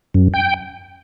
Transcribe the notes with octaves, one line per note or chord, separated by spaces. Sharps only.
F#2
G5